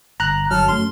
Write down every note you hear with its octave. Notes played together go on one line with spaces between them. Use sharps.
G1 A#5 F#6
G1 F#3 A4 F6
F#2 A3 C6